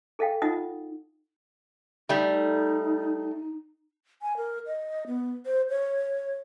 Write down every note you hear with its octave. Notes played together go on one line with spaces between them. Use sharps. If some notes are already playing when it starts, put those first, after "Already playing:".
G#4 A4 D#5 F5 G5
D#4 F4 D#5 F#5 D#6
G3 A3 D#4
G#5
A#4
D#5
B3
C5
C#5